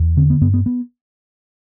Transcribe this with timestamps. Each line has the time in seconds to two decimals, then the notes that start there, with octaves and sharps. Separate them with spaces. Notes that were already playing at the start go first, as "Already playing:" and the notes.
Already playing: E2
0.17 D3 C4
0.30 B3
0.41 G2 B3
0.54 B3
0.66 B3